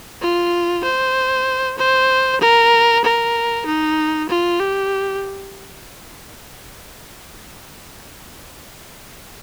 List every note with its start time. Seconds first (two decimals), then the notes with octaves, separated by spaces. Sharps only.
0.22 F4
0.84 C5
1.78 C5
2.41 A#4
3.04 A#4
3.66 D#4
4.29 F4
4.60 G4